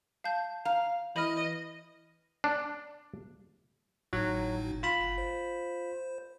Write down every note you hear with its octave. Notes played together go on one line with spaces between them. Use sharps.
F5 A5 G6
F5 A#5
E3 D#5 B5 F6
D4
G#1 A2 F#3 D#4
F4 B5
G1
C5